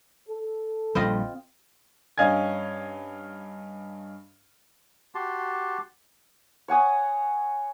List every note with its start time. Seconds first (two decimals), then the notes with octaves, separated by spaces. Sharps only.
0.27 A4
0.95 A#1 G3 C4 F4 D#5
2.18 G2 C#4 D#5 F5 G#5 G#6
5.15 F#4 G4 A5 C6
6.68 C#5 F#5 G#5 D#6